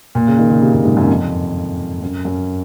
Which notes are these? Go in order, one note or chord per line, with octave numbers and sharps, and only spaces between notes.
A#2
C#3
D#3
C#3
C3
A#2
G#2
F#2
F2
F#2
F#2